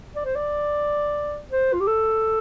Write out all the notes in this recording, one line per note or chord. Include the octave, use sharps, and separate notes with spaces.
D5
C5
D5
C5
F4
G4
A4